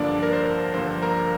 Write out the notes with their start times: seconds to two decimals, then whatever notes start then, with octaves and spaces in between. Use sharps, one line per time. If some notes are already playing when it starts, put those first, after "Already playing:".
Already playing: G2 D3 F3 A#3 D4 D5
0.23 A#4
0.33 C5
0.74 G2 D3 F3 A#3 C5
1.02 A#4 A#5